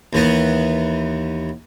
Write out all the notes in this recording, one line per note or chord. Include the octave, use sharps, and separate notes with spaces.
D#2 E3 B3